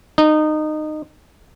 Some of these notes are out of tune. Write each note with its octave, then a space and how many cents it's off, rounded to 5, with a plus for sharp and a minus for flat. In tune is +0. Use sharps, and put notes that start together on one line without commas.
D#4 -20